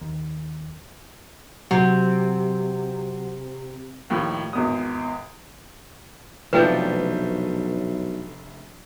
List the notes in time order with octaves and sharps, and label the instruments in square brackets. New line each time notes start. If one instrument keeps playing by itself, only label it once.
[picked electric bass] D#2
[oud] C3 [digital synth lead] F#3
[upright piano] D#2 A2 F3
G#1 E2 D#6
[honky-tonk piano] F1 A3 G6 [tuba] B1 [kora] F3 D4 [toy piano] B4 G5